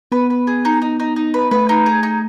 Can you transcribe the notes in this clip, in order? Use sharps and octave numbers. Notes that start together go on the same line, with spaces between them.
B3 B4
B4
G#4
D#4
D#4
D#4
D#4
B4
A3 B4
D#4
G#4
D#4